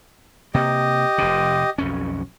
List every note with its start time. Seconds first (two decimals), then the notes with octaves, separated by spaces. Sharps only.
0.54 C3 A#3 G4 D#5
1.18 F1 C3
1.78 B1 F2 C#4